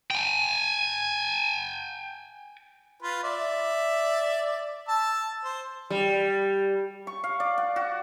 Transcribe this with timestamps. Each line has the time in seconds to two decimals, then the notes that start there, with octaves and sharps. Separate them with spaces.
0.11 G5 G#5
3.02 F4 B4
3.24 D5 E5
4.88 A5 E6
5.45 C5
5.90 G3
7.07 C#6
7.24 F5
7.40 D5
7.58 F#5
7.76 F#4